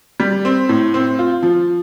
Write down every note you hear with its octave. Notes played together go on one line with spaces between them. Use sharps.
G3
C4
A2
C4
F4
F3